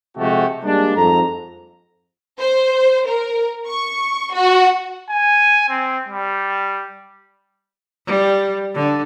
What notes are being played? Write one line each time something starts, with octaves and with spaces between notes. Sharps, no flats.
C3 F3 G#3 A3 F#4 G4
G3 G#3 A#3 D4
F2 G#2 A4 A#5
C5
A#4
C#6
F#4
G#5
C4
G3
G3
D3